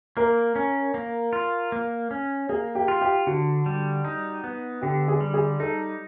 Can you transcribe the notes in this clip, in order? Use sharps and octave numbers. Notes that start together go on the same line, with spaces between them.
A#3 A#4
C#4
A#3
F4
A#3
C#4
A#3 G#4
G4
F4
G4
D3 F#4
G3
D#4
B3
D3 G4
G#4
G3
G#4
D#4 A4